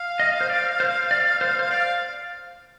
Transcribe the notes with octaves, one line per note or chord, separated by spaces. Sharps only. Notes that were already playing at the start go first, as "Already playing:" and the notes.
Already playing: F5
D#5
C5
D5
C5
D5
C5
C5
D5 F5